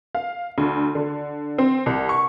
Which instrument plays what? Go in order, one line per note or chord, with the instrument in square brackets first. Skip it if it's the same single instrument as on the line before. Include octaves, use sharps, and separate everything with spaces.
[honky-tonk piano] F5
D2
D3
C4
C2
C#6